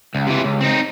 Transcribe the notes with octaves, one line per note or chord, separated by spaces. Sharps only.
C#2
C3 E3
C#2
C4 D#4